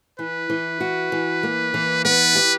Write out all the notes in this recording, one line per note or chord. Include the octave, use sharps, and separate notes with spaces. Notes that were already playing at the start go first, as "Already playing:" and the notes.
E3 B4
E3
F#4
E3
A#3
E3
B3 B4
G4